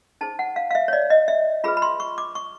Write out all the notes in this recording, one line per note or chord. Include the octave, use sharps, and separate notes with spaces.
D#4 G#4 C5 A5
F#5
F5
F5
E5
C#5
D5
D#5
E5
F4 G#4 B4 B5
B5
C6
C#6
D6
C#6